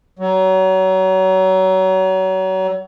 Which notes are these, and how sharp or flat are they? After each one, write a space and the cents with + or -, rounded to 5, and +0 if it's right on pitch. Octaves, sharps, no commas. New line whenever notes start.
F#3 +30